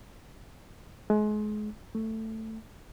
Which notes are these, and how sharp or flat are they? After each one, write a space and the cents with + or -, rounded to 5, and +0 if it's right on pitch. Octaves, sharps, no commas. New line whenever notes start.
G#3 +30
A3 +10